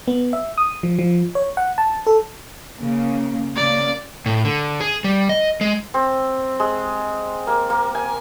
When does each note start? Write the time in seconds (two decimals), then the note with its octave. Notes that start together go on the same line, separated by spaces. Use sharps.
0.08 B3
0.33 E5
0.58 D#6
0.83 F3
0.99 F3
1.35 C#5
1.57 F#5
1.78 A5
2.07 A4
2.80 C#3 A#3
3.56 C#3 A#3 D5
4.26 A2
4.45 D3
4.81 G#4
5.04 G3
5.29 D#5
5.61 G#3
5.94 C4
6.60 G#3
7.47 A#3
7.70 A#3
7.95 G#5